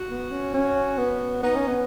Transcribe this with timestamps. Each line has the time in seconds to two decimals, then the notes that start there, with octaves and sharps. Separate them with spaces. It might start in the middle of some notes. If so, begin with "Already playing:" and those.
Already playing: F#4
0.09 B3
0.31 C#4
0.54 C#4
0.98 B3
1.43 B3 D#4
1.55 C#4
1.67 B3